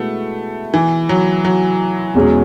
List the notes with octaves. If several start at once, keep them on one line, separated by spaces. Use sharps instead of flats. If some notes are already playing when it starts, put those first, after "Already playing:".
Already playing: B2 G#3 A3 B3 E4
E3
F#3
F#3
E2 B2 G#3 C#4 G#4